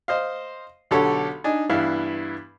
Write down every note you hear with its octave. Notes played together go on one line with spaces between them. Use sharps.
C5 D#5 F5
B1 D3 G4 A4 C#5
D4 D#4 G#5
G2 E3 B3 E4 F5